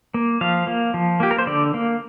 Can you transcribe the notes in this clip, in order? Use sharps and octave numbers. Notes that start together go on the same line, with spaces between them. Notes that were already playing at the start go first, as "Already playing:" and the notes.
A#3
F3 F5
A#3
F3
A#3 G4
A#4
C5
D3 D5
A#3